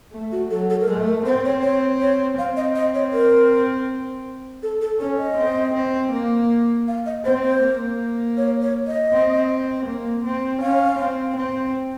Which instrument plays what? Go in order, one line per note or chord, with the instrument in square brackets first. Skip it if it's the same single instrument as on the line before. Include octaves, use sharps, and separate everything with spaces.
[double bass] A3
[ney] F#4
[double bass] F#3 [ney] A4
[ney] A4
A#4
[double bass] A3 [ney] A4
[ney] A#4
[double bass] C4 [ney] C5
[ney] C#5
C#5
C#5
[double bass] C4 [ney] F5
[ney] D#5
D#5
C#5
A#4
A4
A4
[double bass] C#4 [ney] A4
[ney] D#5
[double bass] C4
C4
A#3
[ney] F5
D#5
[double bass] C4 [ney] C5
[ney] C5
[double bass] A#3
[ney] C#5
C#5
D#5
[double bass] C4
A#3
C4
[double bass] C#4 [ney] F5
[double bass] C4
C4